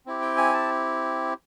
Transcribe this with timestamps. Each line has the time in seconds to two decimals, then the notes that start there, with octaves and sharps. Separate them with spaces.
0.06 C4 E4 G4
0.21 G5
0.37 G#5
0.53 A5